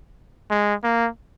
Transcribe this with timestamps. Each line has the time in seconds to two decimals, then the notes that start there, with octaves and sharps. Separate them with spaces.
0.50 G#3
0.84 A#3